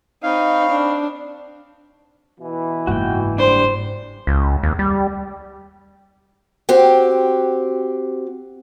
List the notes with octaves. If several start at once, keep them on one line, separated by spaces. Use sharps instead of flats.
C4 D#4 C#5 F5 B5
D4
B2 E3
F#1 G#2 F#4 G5
G3 D4 C5
C#2
D#2
G3
C4 F#4 G4